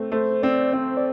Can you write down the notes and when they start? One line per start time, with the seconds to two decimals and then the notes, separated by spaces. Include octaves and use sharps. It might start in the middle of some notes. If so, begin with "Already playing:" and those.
Already playing: A3 C4
0.12 A3 C5
0.43 C4 D5
0.73 C4 C5
0.97 D5